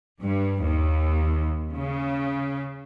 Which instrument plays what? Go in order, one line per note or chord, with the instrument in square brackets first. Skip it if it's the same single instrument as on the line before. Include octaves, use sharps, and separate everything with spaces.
[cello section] G2
D#2
C#3